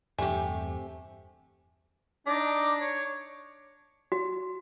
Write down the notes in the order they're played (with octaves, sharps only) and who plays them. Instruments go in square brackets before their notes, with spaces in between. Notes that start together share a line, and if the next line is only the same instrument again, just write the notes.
[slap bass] E2 G2 D4 [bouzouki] C3 [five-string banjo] A3 G4 [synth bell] G#5
[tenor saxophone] D4 [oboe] D#4 [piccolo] D6
[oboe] C#5
[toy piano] F#4